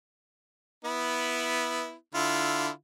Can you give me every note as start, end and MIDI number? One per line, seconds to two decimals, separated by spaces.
0.85 1.94 59
0.85 1.94 64
2.15 2.70 50
2.15 2.70 64
2.15 2.70 65